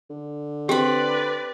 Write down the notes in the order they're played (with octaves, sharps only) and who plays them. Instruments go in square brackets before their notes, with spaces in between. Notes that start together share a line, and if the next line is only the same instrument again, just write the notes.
[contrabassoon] D3
[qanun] C4 B5 [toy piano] G4 [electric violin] B4 D5